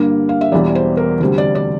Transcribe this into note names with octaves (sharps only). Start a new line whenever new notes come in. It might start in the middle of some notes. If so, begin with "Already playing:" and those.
Already playing: G2 D3 G3 A#3
F5
E5
E1 E2 E3 G3 D5
C5
A#4
D2 C3 G3 C5
D5
D5